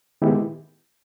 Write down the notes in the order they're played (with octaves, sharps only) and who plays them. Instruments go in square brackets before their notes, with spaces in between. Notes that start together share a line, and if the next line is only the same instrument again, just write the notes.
[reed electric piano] D#3 G#3 B3 E4 G4